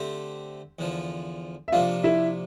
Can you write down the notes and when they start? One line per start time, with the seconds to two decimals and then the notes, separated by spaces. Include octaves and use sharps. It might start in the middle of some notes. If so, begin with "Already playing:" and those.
Already playing: D3 A3 C4 G4
0.79 E2 D3 F3
1.68 E5
1.72 C3 F3 A#3 D4 F4 F5
2.03 E4 E5